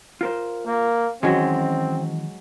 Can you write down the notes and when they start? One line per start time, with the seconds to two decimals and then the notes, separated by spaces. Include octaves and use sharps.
0.21 F4 A#4 C5
0.66 A#3
1.23 D#3 E3 F#3 G#3 C4 C#4